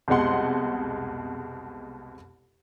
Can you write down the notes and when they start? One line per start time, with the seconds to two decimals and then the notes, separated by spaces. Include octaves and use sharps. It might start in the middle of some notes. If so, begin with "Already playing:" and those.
0.08 C2 F2 B2 G#3 F#5 C6